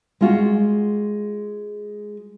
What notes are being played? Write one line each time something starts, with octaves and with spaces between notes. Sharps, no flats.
G#3 F4 F#4